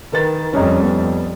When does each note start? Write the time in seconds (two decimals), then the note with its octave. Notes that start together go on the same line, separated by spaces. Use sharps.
0.13 D#3 B4 A6
0.53 F2 G3 C#4 D#5 A#5
0.83 B3